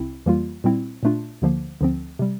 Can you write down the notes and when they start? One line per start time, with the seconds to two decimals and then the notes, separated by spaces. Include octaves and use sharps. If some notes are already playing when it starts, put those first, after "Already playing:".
Already playing: C2 C3 C4 E4
0.26 F2 E3 G3 A#3 F4
0.64 A#2 G3 C4 E4
1.03 A#2 A3 D4 F4
1.42 D2 D3 F3 A#3
1.81 D2 D3 F3 C4
2.19 C3 G3